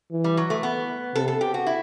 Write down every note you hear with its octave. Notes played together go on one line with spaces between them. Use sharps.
E3
G3
F#3
A3
B3
C3 A4
A4
G4
F#4
E4